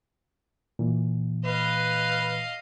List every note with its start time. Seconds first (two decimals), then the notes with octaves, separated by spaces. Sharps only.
0.79 A#2 E3
1.45 B4 D#5 F5